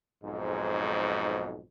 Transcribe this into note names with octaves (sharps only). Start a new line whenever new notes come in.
B1 F2 G#2